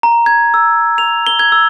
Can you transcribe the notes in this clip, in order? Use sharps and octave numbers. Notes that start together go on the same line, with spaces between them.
A#5
G#6
E6
F7
G7
G#6
E6